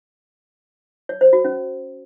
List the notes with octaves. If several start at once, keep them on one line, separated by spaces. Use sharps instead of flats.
C#5
C5
F#4
C#4